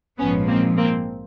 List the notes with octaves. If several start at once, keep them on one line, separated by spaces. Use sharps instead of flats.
A#1 G#2 F3 B3 C#4
A#3 C4
A#3 C4